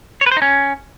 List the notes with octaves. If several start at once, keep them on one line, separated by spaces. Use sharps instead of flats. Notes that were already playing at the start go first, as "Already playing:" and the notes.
C#5
B4
C5
D#4
C#4